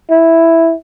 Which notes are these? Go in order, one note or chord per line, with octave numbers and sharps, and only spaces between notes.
E4